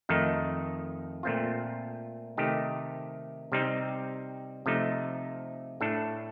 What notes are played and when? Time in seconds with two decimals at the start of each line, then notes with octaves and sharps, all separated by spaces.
0.09 F2 D#3 A3 D#4
1.23 A#2 A3 C4 F4
2.37 C3 D#3 A3 D#4 G4
3.52 C3 G3 C4 D#4
4.66 C3 F3 A3 D#4
5.81 A2 A3 D4 A4